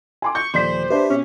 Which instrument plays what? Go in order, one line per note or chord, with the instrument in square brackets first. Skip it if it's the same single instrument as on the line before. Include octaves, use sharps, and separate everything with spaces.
[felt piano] G#5 C6 D6
[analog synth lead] C#6 [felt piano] G6
[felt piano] D#1 D5 B6 [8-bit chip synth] F3 [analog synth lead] C5
[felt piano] D4 B4 [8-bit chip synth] G4 E5
[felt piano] B2 [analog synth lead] C#4